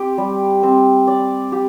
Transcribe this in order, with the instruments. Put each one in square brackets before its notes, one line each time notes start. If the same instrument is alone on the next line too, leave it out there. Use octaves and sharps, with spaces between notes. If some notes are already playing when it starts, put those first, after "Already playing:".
Already playing: [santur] C4 G4
G3
C4
D5
G4